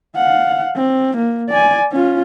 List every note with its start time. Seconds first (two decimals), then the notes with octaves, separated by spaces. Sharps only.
0.16 F5 F#5
0.75 C4
1.17 A#3
1.49 D5 G#5
1.92 C#4 F4